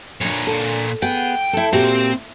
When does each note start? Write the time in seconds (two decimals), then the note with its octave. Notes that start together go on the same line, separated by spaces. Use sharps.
0.21 A#2 D4 F4 C#5
0.47 A4
1.02 B3 G#4 F#5 G5
1.53 E4 A4
1.73 A#2 C4 F#4 G4 G5